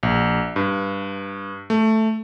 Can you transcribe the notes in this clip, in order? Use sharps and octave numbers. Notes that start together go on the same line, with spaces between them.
A#1
G2
A3